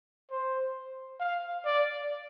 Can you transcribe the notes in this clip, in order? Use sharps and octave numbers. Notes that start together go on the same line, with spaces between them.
C5
F5
D5